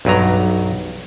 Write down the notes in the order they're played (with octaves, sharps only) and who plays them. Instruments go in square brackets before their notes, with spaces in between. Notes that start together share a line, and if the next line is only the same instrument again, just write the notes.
[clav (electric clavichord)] B1 G2 F#3 A#5